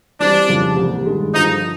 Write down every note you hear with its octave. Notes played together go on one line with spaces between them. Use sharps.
E3 G3 C4 D4
F2 C#3 E3 G3
C2 A#2 G3
G2 D#3 G#3
G2 D3 F3 D#4